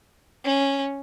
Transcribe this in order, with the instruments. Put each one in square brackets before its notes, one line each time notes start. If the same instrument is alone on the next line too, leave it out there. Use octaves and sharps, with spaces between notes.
[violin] C#4